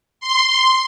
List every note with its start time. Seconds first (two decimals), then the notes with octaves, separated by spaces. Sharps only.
0.20 C6